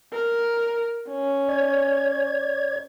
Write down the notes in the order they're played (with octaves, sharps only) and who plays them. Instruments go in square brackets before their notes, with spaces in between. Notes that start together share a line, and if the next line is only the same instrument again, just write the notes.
[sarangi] A#4
C#4
[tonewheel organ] C#5 D5 G#6